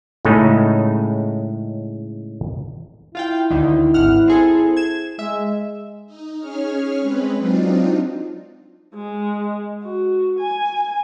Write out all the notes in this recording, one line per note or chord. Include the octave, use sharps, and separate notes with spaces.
A2 C#3 G#3 A3 C#4 D#4
E4 F4 F5 G5
D2 D3 D#3
G#1 F#5 F6
C4 G#4 A4
G#6 E7
G#3 E5
D#4
C#4 G#4 C#5 F6
G#3 C4 B4
F#3 C4 D4 D#4 F4
G#3
F#4
G#5